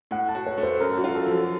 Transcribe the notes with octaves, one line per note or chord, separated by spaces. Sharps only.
A2 F#5
A5
F#4
C#5
A3
C5
F#2 A#4
F#4
F4
A4
F3
F#4